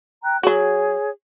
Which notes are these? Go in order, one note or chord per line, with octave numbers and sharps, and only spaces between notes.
G5 A#5 F#6
F#3 F#4 G#4 C#5